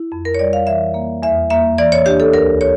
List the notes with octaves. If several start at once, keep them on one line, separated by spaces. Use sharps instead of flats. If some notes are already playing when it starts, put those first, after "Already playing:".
Already playing: E4
F2
A#4
C#5
G3 D5
F5
E3 E5
A#3
E2 E5
A#3 E5
E3 D5
C#5
D4 G4
A4
D2 A#4
C#5